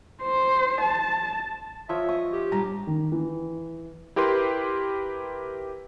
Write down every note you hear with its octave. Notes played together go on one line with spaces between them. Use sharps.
C5
A5
F3 C#5 E5
D#5 C#6
G4
G3 D4 F4 A#5
D#3
E3
E4 G4 A#4 B4 C6